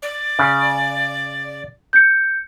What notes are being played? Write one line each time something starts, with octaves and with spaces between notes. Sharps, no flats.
D5
C#3
G6 C#7